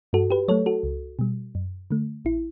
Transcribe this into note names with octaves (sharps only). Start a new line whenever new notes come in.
G2 F#4 A4
G4 B4
F#3 A3 A4 C#5
F#4 A4
C#2
B2 G3
F#2
D3 A3
A1 E4